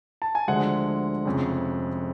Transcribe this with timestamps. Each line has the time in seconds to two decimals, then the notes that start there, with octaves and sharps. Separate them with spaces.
0.22 A5
0.35 G#5
0.48 D2 D3 F3 G#3 F#5
1.25 F1 F2 C#3